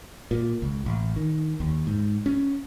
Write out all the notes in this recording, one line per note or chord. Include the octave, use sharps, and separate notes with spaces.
A#2
C#2
A1
D#3
D#2
G#2
C#4